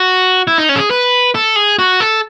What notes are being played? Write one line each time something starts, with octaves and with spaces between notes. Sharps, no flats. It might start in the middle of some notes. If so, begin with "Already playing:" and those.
Already playing: F#4
E4
D#4
C#4
A4
G#4
B4
A4
G#4
F#4
A4